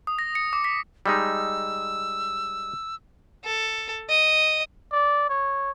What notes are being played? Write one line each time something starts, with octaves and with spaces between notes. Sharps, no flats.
D#6
A#6
C#7
D6
B6
G3 G#3 D#4 E6
A4
D#5
D5
C#5